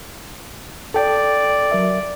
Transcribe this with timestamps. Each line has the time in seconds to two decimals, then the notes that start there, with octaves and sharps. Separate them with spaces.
0.94 A4 D5 G5
1.71 F#3 A#4 E5